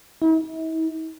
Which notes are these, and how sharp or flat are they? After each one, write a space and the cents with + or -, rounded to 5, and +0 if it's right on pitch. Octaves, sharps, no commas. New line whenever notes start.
E4 -45